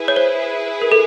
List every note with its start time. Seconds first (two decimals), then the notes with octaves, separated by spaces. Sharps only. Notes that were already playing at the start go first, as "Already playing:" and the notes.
Already playing: E4 G#4 B4
0.08 C#5
0.16 C5
0.82 A#4
0.92 A4